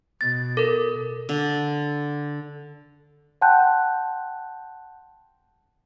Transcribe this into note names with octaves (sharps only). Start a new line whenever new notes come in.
B2 A6
A4 A#4
D3
F#5 G5 A5 C6 F#6 G6